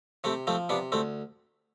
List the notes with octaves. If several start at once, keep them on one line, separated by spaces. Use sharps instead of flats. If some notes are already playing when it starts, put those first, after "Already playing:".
C3 A3 C4
F3 A3 C4
C3 B3 D4
D2 A3 C4